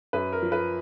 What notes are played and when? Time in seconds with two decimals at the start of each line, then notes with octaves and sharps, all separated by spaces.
0.13 F#2 B4
0.32 A#4
0.42 F3
0.52 B4